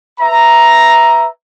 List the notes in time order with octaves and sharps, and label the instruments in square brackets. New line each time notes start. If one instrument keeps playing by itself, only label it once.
[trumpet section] B4 E5 A#5